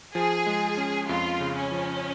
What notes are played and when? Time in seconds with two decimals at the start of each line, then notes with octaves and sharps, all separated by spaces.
0.15 F3 G#4
0.46 G#3
0.77 C#4
1.09 F2 F4
1.40 C#3
1.56 C#4
1.72 F3